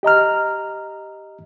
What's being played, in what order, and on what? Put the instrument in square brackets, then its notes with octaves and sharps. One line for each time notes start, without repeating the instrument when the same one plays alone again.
[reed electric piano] G4 D#5 A#5 F6